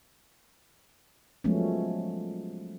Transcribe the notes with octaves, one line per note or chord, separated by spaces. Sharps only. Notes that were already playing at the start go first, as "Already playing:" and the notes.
F3 F#3 G#3 A3 B3 C#4